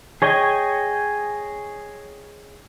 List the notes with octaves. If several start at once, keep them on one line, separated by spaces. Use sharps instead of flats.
G#4 C#5 D#5 G5 G#5